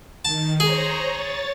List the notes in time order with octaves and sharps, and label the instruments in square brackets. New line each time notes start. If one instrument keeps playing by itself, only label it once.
[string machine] D#3 [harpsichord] A5
[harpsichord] G#4 [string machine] C5 C#5 A#5
[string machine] C#5 A6